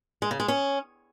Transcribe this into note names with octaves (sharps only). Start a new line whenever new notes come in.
G#3
C#3
G#3
C#4